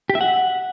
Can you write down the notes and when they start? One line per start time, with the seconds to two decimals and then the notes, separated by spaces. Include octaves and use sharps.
0.10 G4
0.15 E5
0.21 F#5